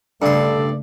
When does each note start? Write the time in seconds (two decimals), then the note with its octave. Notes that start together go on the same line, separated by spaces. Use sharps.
0.22 G2 C#3 A3 A4 D5 C6